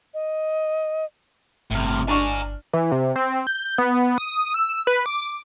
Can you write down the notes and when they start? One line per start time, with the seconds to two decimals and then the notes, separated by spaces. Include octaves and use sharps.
0.14 D#5
1.71 G1 A2 C3 F6
2.08 D4 G#5 A#5 C#6
2.73 E3
2.92 C3
3.16 C4
3.47 G6
3.78 B3
4.18 D#6
4.54 E6
4.87 B4
5.06 D6